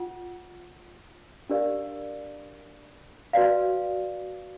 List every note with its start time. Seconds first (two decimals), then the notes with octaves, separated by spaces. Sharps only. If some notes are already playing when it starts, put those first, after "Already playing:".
Already playing: F4 F#5
1.50 D4 G4 A#4 D5 F5
3.33 F#4 B4 D5 F5